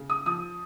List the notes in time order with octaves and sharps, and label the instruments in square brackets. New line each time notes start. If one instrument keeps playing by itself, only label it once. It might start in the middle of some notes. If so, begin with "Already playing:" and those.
Already playing: [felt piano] C#3
D#6
F3 D#6